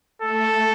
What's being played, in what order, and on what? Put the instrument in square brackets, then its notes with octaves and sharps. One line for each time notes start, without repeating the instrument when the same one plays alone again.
[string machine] A3 [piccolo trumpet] A4